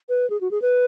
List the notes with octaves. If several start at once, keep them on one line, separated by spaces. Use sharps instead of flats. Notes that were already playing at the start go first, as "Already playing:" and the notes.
B4
G#4
F#4
G#4
B4